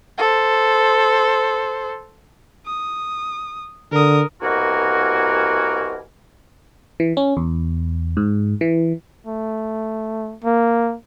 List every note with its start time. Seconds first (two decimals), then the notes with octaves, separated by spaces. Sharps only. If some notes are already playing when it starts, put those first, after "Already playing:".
0.18 A4 C5
2.66 D#6
3.92 D3 A#4 D#6
4.42 C2 B2 A#3 F#4 A#4 G#5
7.00 E3
7.17 C#4
7.37 E2
8.17 G#2
8.61 E3
9.27 A3
10.44 A#3